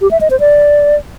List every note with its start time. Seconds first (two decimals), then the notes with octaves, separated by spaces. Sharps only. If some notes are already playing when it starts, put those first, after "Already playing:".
0.01 G4
0.11 E5
0.21 D#5
0.30 C5
0.40 D5